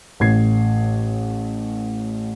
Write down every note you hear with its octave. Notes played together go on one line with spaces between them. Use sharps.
A1 A2 G#6 C7